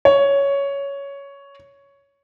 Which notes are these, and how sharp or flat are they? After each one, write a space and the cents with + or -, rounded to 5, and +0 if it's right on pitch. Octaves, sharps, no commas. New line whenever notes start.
C#5 +10